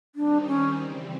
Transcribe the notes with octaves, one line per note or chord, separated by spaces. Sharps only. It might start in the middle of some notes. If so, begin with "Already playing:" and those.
D#3 G3 C4 D4 D#4
C#4
C#3 E3 G3 C4